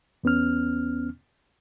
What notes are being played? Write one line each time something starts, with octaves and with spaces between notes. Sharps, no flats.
E2 B3 C#4 F6